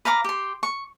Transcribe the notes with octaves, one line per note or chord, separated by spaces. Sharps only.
B4 F5 A#5 D6
G4 C6
C#6